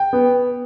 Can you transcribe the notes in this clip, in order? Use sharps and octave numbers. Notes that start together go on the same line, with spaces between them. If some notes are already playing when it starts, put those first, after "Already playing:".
Already playing: G5
B3